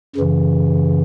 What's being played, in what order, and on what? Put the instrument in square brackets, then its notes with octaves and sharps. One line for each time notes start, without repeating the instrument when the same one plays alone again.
[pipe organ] F#2 C#3 E3